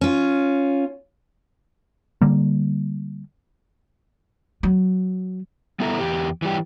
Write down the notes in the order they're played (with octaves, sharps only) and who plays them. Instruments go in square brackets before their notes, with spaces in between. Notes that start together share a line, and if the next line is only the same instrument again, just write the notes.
[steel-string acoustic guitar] C#4 F4
[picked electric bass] D3 G3 A#3
[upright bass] F#3
[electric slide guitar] G3 B3 E4 A4 E5 A#5
E2 A#2 G4
E3 G3 G4